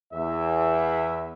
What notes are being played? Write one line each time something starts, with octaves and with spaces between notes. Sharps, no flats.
E2 E5